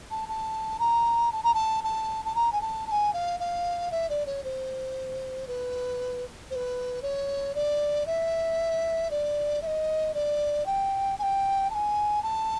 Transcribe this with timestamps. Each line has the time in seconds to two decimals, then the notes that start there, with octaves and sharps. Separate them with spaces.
0.11 A5
0.28 A5
0.79 A#5
1.32 A5
1.43 A#5
1.54 A5
1.84 A5
2.25 A5
2.35 A#5
2.52 G#5
2.61 A5
2.87 A5
2.91 G#5
3.13 F5
3.39 F5
3.91 E5
4.09 D5
4.26 C#5
4.44 C5
5.47 B4
6.50 C5
6.55 B4
7.02 C#5
7.55 D5
8.06 E5
9.10 D5
9.62 E5
9.66 D#5
10.14 D5
10.66 G5
11.18 G#5
11.22 G5
11.70 A5
11.75 G#5
12.22 A5